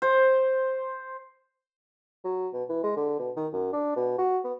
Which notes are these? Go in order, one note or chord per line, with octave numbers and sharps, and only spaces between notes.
C5
F#3
B2
E3
G#3
D3
B2
D#3
F#2
D4
B2
F#4
B3